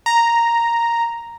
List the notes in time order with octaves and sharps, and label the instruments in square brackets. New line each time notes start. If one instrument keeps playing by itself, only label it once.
[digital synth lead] A#5